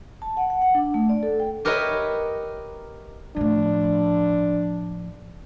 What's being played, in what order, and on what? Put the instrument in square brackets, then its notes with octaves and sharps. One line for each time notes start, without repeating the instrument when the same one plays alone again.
[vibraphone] A5
F#5
F#5
F#5
D4
A3
D5
A4
G5
[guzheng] G4 A#4 B4 C#5 D#5 E5
[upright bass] A2 F3 [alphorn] D4